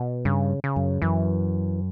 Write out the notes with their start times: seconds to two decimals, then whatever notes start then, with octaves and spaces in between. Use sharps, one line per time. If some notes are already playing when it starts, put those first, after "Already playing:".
Already playing: B2
0.25 G2 C#3
0.64 C#3
0.76 F#2
1.02 F#2 E3